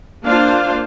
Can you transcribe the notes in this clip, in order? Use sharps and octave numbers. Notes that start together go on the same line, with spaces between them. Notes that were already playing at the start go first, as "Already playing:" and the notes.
A#3 D4 F4 C5 F5